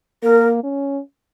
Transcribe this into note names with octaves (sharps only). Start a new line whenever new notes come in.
A#3 A#4
C#4